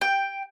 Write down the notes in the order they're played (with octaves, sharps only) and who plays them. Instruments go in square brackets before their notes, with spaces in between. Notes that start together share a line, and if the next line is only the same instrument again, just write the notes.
[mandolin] G5